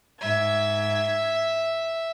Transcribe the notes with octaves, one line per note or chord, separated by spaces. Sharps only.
G#2 E5 G#6